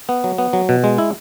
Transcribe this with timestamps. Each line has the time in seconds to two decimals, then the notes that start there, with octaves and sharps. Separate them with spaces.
0.09 B3
0.24 F#3
0.38 B3
0.53 F#3
0.69 B2
0.84 G#3
0.98 E4